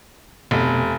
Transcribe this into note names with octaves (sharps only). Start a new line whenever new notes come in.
F1 B2